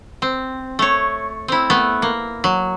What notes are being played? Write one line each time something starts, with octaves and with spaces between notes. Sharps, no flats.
C4
A3 C#5
C4 E4
A3 B3
A#3
F#3